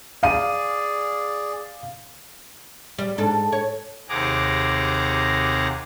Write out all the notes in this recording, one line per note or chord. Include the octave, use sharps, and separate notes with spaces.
G#4 D5 F5 D#7
G3
G#2 D4 A4
C#5
D#2 C3 G#4 F#5 A#5 D6